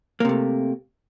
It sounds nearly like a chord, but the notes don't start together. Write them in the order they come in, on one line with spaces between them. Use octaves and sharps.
A#3 C3 A3